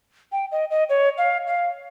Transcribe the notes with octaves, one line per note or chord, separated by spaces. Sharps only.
G5
D#5
D#5
C#5
F5
F5